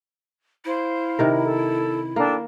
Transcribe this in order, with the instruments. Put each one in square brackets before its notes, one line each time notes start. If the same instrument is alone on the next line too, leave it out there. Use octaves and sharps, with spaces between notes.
[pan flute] E4 [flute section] C5 F5
[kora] C3 D#3 A#4
[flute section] A4
[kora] A#3 [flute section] D4 A4 G5